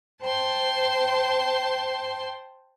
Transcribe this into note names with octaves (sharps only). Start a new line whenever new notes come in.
C5 G5 A5 C6